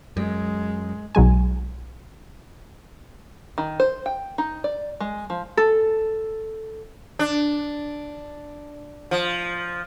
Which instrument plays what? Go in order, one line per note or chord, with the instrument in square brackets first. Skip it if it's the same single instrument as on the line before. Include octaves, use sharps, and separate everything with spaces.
[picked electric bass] F#2 [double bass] G#3
[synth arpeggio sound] B1 F#3 G#3 G#5
[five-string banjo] D#3
C5
G5
D#4
D5
G#3
F3
[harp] A4
[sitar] D4
F3